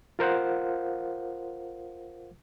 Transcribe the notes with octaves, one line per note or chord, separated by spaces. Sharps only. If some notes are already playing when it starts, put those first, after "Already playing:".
F4 A#4 C5 F5 F#5